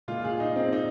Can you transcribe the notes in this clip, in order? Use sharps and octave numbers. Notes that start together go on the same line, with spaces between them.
A#2 G#3 F4
G#4
D#4
C4
D#4